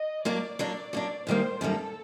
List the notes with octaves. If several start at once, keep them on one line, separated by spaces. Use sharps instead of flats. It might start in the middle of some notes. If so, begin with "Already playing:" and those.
Already playing: D#5
F#3 A#3 D4 D5
F#3 A#3 D4 D5
F#3 A#3 D4
F#2 D#3 G3 A#3 C5
F#2 D#3 G3 A#3 A4